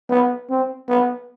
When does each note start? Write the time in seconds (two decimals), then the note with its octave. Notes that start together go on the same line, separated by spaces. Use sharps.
0.10 B3
0.50 C4
0.89 B3